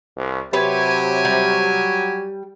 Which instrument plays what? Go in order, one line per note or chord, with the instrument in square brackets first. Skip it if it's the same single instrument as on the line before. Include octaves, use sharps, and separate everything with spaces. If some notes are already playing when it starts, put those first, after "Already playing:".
[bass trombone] C2
[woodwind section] C3 [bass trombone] F#3 [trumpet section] G4 G#5 [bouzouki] B4 C#5
[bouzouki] G3